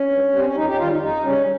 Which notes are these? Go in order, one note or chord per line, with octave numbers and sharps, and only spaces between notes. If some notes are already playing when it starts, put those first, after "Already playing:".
Already playing: C#4
G2
G3 C4
C#4
F2 D#4
G4
D#4
D#3 G3 F4
D#4
F2 D#4
C#3 G3 C#4